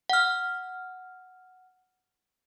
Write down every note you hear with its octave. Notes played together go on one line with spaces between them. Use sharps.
F#5 F6